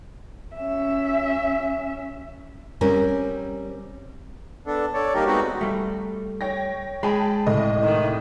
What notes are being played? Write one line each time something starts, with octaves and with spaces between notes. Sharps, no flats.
C#4 E5
G3 C4 C#4 A#4
B3 D4 A4
A4 C#5 D5
G3 A#3 D#4 G4 A#4
G#3 B3 C4 D#4 F#4
G3 A3
C#5 G5 A#6
G#3 G#4 G5 A5 B5
C2 A2 A3 D#5
D#3